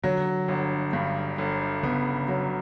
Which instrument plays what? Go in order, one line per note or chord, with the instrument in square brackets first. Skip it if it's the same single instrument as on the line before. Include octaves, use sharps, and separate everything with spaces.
[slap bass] D3 [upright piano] F#3
[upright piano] G1
G2
G1
[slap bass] C#3 [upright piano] B3
[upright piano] F#3